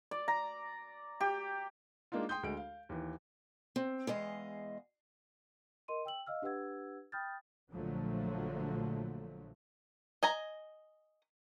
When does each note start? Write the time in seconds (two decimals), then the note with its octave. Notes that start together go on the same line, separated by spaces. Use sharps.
0.11 D5
0.28 A#5
1.21 G4
2.12 G#3 A#3 D4 D#4 F4
2.29 G5 C6 D#6 G6
2.43 D2 G#3 D7
2.57 F5
2.89 D#2 E3
3.76 C4
4.07 E2 G#3 D#5 F5
5.88 A#4 D#5 C6 D#7
6.05 G5 E6 F#7
6.27 D#5 F5 E6 F6
6.42 D4 G4 B4 F#5 E6 G#6
7.12 G5 B5 D#6 F6 G6 A6
7.72 A#1 A#2 D3 F3 F#3 A3
10.23 D#5 G#5 A#5